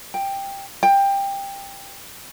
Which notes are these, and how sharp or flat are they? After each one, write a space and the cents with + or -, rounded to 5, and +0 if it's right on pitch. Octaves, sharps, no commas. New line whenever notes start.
G5 +10
G5 +15